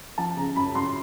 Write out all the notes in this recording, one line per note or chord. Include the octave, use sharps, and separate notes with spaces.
F3 A5
C#3 A#5
F#2 B5
F#2 C6